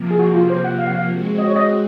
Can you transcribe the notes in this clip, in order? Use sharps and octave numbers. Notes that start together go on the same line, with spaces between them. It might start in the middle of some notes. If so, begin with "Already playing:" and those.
Already playing: C3 F3 A#3
G#4
F#4
F4
C5
F#5
F5
F#5
F5
G#3 C4 F#4
D#5
C#5
D#5